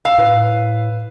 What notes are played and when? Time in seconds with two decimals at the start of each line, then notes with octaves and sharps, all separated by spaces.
0.05 F5 E6
0.18 A2 B4